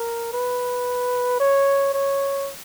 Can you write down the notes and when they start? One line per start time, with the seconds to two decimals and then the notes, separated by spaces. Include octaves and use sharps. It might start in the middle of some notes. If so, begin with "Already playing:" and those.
Already playing: A#4
0.33 B4
1.40 C#5
1.94 C#5